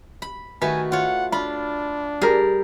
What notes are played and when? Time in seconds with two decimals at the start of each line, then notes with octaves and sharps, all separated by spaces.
0.22 B5
0.62 D#3 A3 F#4 B4 G#5
0.92 F4 C#5 F#5
1.32 D4 F4 B5
2.21 G3 G#4 A#4